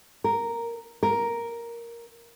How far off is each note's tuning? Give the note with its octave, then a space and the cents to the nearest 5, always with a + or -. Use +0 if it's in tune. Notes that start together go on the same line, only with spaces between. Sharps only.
A#4 -5
A#4 +5